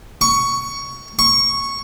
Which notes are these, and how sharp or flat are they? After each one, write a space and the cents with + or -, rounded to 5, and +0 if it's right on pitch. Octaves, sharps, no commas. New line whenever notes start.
C#6 +10
C#6 -5